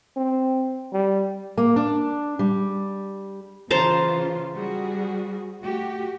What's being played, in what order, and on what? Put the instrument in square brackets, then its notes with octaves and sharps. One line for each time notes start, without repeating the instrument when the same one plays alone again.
[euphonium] C4
G3
[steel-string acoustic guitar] A#3
D4
G3
[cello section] C#3 E3 F4 [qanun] C5 A5 A#5
[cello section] G3 F#4 G#4
A3 F#4 G4